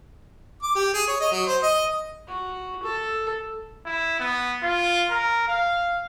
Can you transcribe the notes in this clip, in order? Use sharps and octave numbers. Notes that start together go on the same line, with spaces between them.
D6
G4
G#4
C#5
D#5
F#3
C5
D#5
F#4
A4
E4
B3
F4
A#4
F5